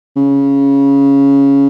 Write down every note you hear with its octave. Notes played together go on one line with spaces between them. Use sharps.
C#3